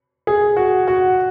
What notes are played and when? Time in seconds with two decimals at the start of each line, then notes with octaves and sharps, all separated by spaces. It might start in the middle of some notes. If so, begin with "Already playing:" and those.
0.27 G#4
0.56 F#4
0.88 F#4